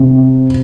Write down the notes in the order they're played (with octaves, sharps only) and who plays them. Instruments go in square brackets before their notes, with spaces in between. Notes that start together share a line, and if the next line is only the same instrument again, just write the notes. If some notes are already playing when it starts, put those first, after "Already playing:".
Already playing: [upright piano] C3 C4